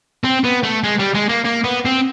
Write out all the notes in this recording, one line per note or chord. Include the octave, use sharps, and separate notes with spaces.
C4
B3
A3
G#3
G3
G#3
A#3
A#3
B3
C4